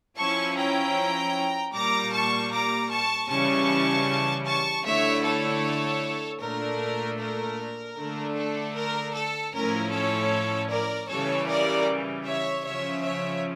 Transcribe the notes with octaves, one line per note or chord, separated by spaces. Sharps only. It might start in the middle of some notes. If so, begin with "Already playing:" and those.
F3 C#4 E4 A5 C#6
G5 A#5
A#2 G3 A#3 A#5 D6
A5 C#6
A#5 D6
A5 C#6
C#3 E3 G3 C#4 A5 C#6
A5 C#6
D3 A3 E4 C#5 E5
A4 C#5
A#2 A3 D4 A#4
A#4
D3 A3 D4
A4
A#4
A4
A2 F3 C#4 E4 A#4
A4 C#5
A#4 D5
C#3 E3 G3 A4 C#5
A#4 D5
C#5 E5
C#3 F3 C#4 C#5 E5
C#5 E5